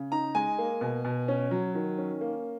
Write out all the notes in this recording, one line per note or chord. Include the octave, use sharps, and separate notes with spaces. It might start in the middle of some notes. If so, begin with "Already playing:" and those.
Already playing: C#3
D#4 A#5
G#3 G#5
A#3
B2
B2
C#4
F#3
D#3
C#4
A#3